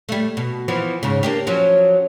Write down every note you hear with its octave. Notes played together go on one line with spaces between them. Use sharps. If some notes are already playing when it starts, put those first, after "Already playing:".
G3 A3
B2
E3 F3 B3
G#2 C#3
A#3 D4 G4
F3 F#3 C#4